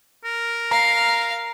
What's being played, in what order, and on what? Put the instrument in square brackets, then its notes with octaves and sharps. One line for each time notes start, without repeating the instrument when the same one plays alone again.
[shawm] A#4
[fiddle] F5 [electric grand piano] A#5